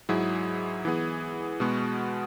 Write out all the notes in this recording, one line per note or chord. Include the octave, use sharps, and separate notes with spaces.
G#2 F#3 E4 G#4
E3 B3 G#4
B2 G#3 B3 F#4